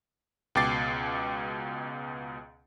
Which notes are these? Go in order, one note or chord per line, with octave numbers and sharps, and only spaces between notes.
C#2 B2 G5 D6 A6 C7